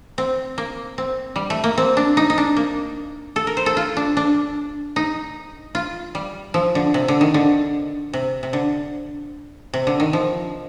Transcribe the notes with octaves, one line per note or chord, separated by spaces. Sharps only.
C4
A#3
C4
G3
A3
A#3
C4
D4
D#4
D#4
D4
A#3
A4
A#4
C5
A4
F4
D4
D4
D#4
F4
G3
F3
D3
C3
D3
D#3
D3
C3
C3
D3
C3
D3
D#3
F3